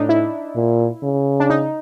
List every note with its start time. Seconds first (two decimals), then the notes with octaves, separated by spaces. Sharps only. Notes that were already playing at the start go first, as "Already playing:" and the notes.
Already playing: A2 D4 D#4
0.09 E4
0.56 A#2
1.03 C#3
1.40 D4
1.50 D#4